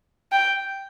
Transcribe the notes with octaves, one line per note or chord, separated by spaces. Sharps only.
G5